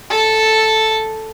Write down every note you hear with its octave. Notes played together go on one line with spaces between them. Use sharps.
A4 A5